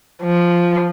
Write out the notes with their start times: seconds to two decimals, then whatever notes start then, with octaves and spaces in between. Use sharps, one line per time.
0.23 F3